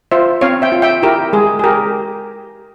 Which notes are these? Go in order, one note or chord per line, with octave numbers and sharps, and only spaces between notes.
F4 C5 E5
C4 C#5 F5
E5 G5
F4
E5 G5
E4 G4 A#4
G#3 G#4
G#4
G4 A#4